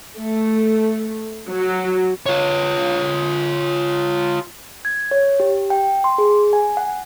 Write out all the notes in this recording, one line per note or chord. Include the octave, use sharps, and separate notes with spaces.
A3
F#3
F4 C#5
G#6
C#5
G4
G5
C6
G#4
G#5
F#5